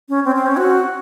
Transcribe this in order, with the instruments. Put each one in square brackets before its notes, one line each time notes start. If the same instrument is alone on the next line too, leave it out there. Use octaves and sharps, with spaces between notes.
[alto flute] C#4
C4
C4
C#4
F#4